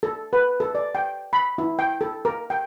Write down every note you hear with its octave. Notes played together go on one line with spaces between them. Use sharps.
A4
B4
A4
D5
G5
B5
E4
G5
A4
A#4
G5